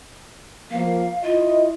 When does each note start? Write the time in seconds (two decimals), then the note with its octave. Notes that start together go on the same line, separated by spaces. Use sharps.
0.71 F3 A#3 F5
1.23 E4 F4 D#5